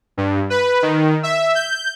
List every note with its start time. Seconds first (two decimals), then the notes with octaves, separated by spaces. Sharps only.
0.17 G2
0.50 B4
0.82 D#3
1.23 E5
1.55 G6